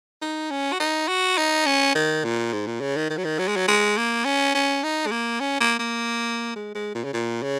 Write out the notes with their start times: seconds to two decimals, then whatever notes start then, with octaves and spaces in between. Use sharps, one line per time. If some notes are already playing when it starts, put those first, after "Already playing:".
0.22 D#4
0.51 C#4
0.72 F#4
0.80 D#4
1.08 F#4
1.38 D#4
1.66 C#4
1.95 D#3
2.24 A#2
2.53 G#2
2.67 A#2
2.81 C#3
2.96 D#3
3.10 D#3
3.17 F#3
3.25 D#3
3.39 F#3
3.48 G#3
3.56 F#3
3.68 G#3
3.97 A#3
4.25 C#4
4.55 C#4
4.83 D#4
5.06 G#3
5.11 A#3
5.40 C#4
5.60 A#3
5.79 A#3
6.56 G#3
6.75 G#3
6.95 A#2
7.04 C#3
7.13 A#2
7.43 C#3